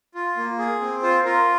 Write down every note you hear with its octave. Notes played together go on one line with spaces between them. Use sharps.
F4
A#3
G#4
C4
F4 C5
F4 A#4